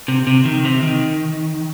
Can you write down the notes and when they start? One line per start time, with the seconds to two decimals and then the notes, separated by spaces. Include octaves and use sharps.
0.08 C3
0.27 C3
0.45 D#3
0.65 C3
0.83 D#3